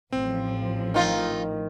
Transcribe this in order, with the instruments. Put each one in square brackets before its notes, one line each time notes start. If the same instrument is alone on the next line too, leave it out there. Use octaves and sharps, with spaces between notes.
[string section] A1 F3 [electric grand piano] C4
[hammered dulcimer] D#3 [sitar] D#4 F4